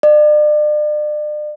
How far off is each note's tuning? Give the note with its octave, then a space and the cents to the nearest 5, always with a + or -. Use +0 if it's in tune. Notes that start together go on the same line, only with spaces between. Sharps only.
D5 +40